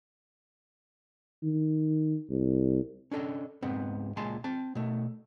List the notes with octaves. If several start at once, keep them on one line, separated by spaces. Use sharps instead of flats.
D#3
C2
C#4 D4 A4 D#5
C#2 G#2 B3 C4
C#2 A#2 G#3 G#5 A5 C6
C4 A5
B2 A3